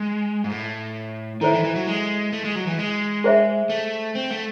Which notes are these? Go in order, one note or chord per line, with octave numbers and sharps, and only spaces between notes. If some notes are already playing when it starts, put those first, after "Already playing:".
Already playing: G#3
G#2
A2
D#3 E4 A4 C5 E5
E3
E3
F#3
G#3
A3
G#3
F#3
E3
G#3
G#4 C5 E5
A3
C4
A3